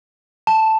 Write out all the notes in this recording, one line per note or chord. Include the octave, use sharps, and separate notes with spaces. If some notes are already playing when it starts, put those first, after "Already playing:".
A5